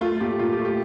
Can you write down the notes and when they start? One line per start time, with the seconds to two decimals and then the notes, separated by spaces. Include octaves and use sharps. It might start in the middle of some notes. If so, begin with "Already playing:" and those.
0.01 A3 F4
0.20 A#2 G4
0.39 A#2 F4
0.53 G4
0.59 A3
0.65 G4